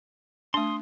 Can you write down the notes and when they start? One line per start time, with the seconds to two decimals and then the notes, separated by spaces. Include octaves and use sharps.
0.54 A3 D4 C6 D#6